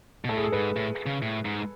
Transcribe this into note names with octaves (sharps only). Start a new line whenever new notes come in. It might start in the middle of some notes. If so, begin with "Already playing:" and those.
B2
A2 A4
G#4
A4
G#2 B4
A2
C#3
A2
G#2